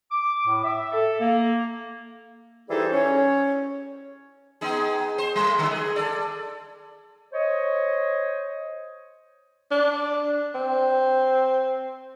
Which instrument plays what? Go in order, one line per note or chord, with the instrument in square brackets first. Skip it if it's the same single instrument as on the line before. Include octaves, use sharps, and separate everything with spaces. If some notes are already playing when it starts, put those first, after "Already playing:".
[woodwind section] D6
A2
E5
A4
A#3
E3 G3 D#4 G#4 A4 C5
C#4 C#5
[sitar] B3 D#4 G#4
C5
G3 A3
D3 D#3 F#3
G#4
A4 D5
[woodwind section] C5 C#5 D#5
[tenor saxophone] D4
C4